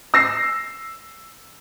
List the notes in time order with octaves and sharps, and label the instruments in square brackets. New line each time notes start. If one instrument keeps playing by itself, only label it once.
[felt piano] E6 A#6 C7